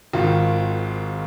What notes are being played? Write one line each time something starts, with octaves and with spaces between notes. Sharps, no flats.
G#1 G#2 D#3 F4